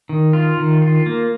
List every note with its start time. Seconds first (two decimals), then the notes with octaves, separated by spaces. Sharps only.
0.09 D#3
0.33 F4
0.57 D#3
0.82 F4
1.06 A#3